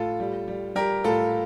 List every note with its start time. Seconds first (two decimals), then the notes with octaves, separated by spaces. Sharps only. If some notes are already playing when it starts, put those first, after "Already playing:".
Already playing: A2 F4 A4
0.20 G3
0.48 G3
0.75 G3 G4 A#4
1.04 A2 F4 A4